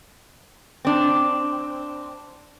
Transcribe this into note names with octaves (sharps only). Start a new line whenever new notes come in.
C4 D4